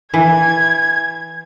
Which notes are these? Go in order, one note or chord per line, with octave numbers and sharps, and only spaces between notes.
E3 G#6